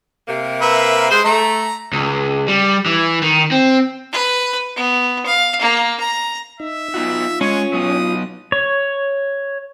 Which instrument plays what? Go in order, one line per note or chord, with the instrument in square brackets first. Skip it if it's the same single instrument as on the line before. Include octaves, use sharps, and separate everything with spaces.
[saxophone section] C3 A#3
[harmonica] A#4 B4 E5
[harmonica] G#3 [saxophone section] C5
[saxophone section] A3 [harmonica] A#5
[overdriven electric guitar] C#2
G3
E3
D#3
C4
[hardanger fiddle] B4
B3
F5
A#3
A#5
[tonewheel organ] D#4 [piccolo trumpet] E5
[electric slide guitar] B3 D#4 F#4 [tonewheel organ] F4
[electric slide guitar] G#3 [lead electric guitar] C#4 [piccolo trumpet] C#5
[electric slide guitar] F#3 B3 [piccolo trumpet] D#6
[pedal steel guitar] C#5